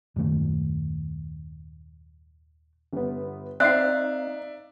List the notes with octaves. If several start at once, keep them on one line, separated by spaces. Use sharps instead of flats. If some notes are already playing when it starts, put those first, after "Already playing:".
D#1 F#2 D#3 A3
G1 B3
C4 D#4 D5 E5 F5 F#6 C7